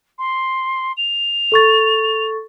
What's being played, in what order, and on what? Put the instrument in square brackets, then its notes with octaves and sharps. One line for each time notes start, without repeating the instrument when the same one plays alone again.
[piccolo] C6
F7
[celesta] A4 C#6 A6